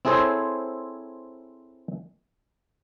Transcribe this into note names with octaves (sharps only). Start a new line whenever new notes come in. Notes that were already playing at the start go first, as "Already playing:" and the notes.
C4 E4 G#4 A4 C5 C#5